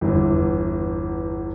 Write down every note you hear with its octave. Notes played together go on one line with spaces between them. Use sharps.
G1 E2 E3